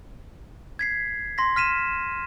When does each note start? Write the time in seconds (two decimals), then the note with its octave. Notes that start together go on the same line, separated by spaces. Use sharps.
0.79 G#6 B6 C7
1.38 C6 A#6 B6
1.56 F6 B6 D#7 E7